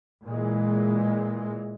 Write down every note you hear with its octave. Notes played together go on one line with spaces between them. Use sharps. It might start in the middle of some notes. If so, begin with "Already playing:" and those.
A#2 E3 G#3